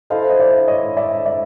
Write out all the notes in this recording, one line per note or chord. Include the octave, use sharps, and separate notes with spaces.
E4 A4 C5 D#5 F5
D#5
D5 E5
C#5 D#5
D5 E5
D5 E5